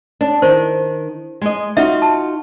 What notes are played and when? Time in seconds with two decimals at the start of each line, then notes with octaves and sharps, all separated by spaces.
0.21 D4
0.42 D#3 C5
1.41 G#3 D#5
1.77 D#4 F4 F#4 E5
2.02 A5